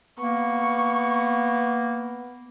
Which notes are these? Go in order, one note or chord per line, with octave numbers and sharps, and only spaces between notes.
A#3 B3 C#6